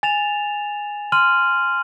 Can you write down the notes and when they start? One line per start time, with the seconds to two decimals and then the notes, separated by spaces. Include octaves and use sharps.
0.03 G#5 A6 E7 F7
1.12 C6 F6 D#7 F#7